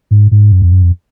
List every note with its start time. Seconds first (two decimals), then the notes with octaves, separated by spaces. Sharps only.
0.11 G#2
0.31 G#2
0.52 F#2
0.62 F2
0.72 F#2
0.82 F2